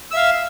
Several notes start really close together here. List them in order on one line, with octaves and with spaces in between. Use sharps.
E6 E5 F5